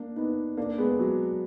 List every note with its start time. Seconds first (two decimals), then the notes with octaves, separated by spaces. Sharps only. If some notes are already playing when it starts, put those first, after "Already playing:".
Already playing: A#3 D4
0.16 B3 D#4
0.57 A#3 D4
0.78 G#3 B3
0.99 F#3